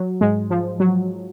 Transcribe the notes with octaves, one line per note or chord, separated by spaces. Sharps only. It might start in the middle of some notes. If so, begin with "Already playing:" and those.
Already playing: F#3
G#2 G#3
F3
F#3